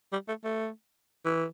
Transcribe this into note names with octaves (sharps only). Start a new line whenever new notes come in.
G3
A3
A3
E3